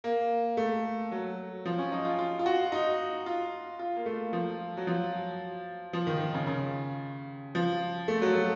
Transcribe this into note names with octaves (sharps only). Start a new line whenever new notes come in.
A#3
A3
F#3
F3
C#4
D#4
F4
F4
F4
F#4
D#4
F4
F4
A#3
A3
F3
F#3
F3
F3
D#3
D#3
C#3
C#3
F3
A3
F#3
A3